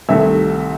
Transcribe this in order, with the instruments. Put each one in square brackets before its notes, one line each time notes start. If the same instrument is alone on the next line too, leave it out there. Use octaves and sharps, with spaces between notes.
[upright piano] C2 C3 D#3 A3 E5